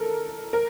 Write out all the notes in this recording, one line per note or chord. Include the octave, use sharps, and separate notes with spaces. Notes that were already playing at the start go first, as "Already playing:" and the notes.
Already playing: A4 A#4
A#4